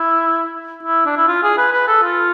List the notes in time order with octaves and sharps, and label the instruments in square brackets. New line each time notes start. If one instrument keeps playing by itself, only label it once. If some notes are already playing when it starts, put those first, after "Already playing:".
Already playing: [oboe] E4
E4
D4
E4
F4
G#4
B4
B4
A4
F4